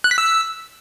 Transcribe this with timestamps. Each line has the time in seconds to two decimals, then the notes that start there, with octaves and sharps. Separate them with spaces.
0.04 F#6
0.11 B6
0.18 E6